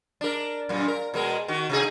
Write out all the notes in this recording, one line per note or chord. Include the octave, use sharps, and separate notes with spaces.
D4 A#4
F#2 A#2
A#4
B2 G#3 A#4
D#3 F#4
C3 D#4 G#4